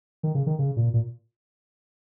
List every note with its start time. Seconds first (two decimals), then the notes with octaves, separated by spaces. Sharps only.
0.23 D#3
0.35 C#3
0.47 D#3
0.59 C#3
0.77 A#2
0.94 A#2